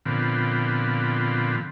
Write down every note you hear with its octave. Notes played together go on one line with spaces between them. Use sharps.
A#2 D3 F3 B3 C4